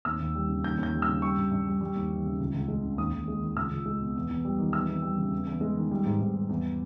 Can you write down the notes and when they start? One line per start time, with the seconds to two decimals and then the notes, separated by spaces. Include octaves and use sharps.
0.05 D#2 E6
0.20 D#2
0.35 G3
0.49 C#3
0.64 D#2 G6
0.78 D#2
0.83 G6
0.94 G3
1.02 E6
1.08 C#3
1.22 G3 C#6
1.36 G2
1.51 G2
1.67 G3
1.81 G3
1.96 D#2
2.11 E3
2.25 C#3
2.40 C#2
2.54 C#2
2.68 G#3
2.83 C#3
2.97 D#2 D#6
3.12 D#2
3.28 G#3
3.42 D#3
3.57 C#2 E6
3.71 C#2
3.86 G#3
4.01 B2
4.16 E2
4.29 E2
4.45 G3
4.59 D#3
4.73 E2 E6
4.88 E2
5.02 G3
5.18 C#3
5.32 E2
5.47 E2
5.61 G#3
5.77 D#3
5.91 G3
6.06 G#2
6.21 G#2
6.35 G3
6.49 E2